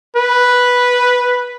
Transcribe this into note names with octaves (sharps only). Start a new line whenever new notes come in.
B4